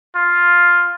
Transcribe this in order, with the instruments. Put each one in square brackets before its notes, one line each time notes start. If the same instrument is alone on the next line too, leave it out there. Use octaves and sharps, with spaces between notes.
[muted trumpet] F4